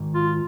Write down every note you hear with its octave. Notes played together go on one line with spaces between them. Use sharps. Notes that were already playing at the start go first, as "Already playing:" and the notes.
Already playing: G#2 D#3 G#3
F4